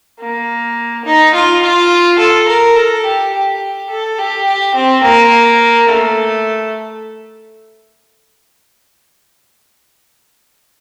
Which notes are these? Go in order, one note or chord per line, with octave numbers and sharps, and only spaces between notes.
A#3
D#4
F4
F4
A4
A#4
A4
G4
G4
A4
G4
G4
C4
A#3
A3